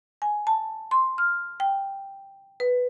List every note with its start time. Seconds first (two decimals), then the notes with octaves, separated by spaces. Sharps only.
0.22 G#5
0.47 A5
0.91 C6
1.18 F6
1.60 G5
2.60 B4